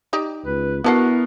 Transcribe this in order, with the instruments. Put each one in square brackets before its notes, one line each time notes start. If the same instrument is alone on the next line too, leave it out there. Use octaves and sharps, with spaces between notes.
[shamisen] D#4 G4 D5
[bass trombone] C#2 [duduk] B4
[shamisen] D3 A4 F#5 [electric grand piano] B3 A#4 C7 [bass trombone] E4 [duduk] F#4